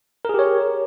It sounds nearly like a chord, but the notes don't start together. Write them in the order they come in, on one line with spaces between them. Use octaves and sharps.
A#4 G#4 G4 C#5